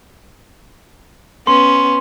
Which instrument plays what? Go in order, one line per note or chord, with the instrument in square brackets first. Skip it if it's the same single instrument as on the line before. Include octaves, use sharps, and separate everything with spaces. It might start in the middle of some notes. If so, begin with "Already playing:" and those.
[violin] B3 C#4 [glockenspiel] C6